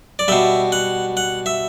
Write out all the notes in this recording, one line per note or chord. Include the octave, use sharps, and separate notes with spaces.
D5
B2 G3 E5
F#5
F#5
E5